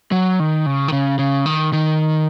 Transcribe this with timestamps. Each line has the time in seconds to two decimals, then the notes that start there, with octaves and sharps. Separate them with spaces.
0.12 F#3
0.40 D#3
0.66 C#3
0.88 D#3
0.92 C#3
1.19 C#3
1.46 D#3
1.73 D#3